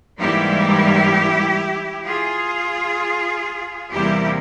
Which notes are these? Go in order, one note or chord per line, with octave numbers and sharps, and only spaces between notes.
G#2 E3 G3 A#3 E4 G4
F4 G#4
E2 C3 G3 A#3 E4 G4